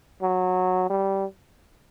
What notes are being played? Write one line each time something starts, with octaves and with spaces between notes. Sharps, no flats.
F#3
G3